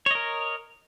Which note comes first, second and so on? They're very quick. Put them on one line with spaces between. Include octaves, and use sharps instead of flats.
C#5 D#5 A#4